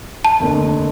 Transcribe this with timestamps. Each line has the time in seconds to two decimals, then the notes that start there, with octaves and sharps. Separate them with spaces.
0.25 A5
0.40 F1 D#2 D3